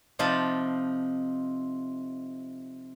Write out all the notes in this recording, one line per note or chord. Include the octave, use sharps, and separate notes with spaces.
C3 F3 D#4 F4 A5 B5